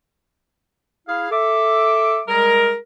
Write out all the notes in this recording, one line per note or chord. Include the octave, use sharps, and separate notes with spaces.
E4 G#4 F5
A4 E5 D6
G3 G#3 G#4 A#4